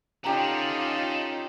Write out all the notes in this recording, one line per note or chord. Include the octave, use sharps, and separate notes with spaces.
C#4 D#4 F4 G4 A4 F#5 A#5